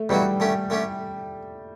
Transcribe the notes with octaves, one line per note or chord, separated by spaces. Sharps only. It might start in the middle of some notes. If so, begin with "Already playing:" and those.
Already playing: A3
E2 B2 F#3 G3 B3 F#4
D3 A3 C#4 G4
D3 A3 C#4 G4